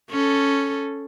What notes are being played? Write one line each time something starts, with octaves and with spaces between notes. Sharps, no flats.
C#4 A4